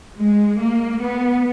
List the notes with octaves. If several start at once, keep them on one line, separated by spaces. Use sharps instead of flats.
G#3
A#3
B3